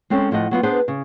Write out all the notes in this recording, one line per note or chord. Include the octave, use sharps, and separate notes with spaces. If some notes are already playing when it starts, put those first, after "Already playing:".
G#3 C4 C#4 A4
A2 F3 A3 D#5 F#5
F#3 B3 F4
B3 D4 G#4 B4 C5
C#3